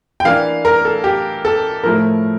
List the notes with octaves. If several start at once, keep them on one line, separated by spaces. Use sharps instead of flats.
G5
E3 A#3 D4 F5
A#4
A4
G4
A4
A2 F3 A3 E4 A#4